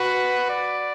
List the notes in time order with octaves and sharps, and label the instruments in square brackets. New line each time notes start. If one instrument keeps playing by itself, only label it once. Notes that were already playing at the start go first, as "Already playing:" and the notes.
Already playing: [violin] F#4 [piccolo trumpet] B4
[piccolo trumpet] D5